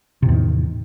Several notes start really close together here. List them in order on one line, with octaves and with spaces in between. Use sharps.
C3 A2 E2 D#3